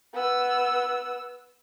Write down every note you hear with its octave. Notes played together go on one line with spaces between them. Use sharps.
B3 E6